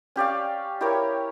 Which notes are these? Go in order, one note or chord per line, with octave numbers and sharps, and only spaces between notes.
C#4 G4 D5 F5
E4 G4 A#4 C#5